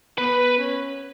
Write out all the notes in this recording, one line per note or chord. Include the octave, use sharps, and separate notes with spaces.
B3 B4
C#4